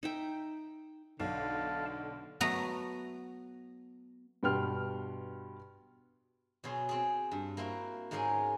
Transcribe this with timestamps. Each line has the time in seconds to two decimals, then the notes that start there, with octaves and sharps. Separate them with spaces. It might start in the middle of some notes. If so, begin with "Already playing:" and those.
0.03 D#4 E5 G5
1.20 B1 D3 F5 A5
2.41 F#3 A3 B3 A#5
4.43 G2 B2 B3 G5 C6 F6
6.64 B2 F#3 G#4 C6
6.89 C4 G#4
7.31 G2
7.57 A#3 C4 E4 F#4
8.11 G#2 G#3 A#3 C#4 D#4 A#4